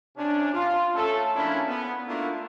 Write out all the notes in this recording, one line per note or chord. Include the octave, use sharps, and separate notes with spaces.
C3 C#4 D4
F4
A3 C#4 A4
F3 A#3 C#4 D4 E4
B3
A3 A#3 D4 E4 F4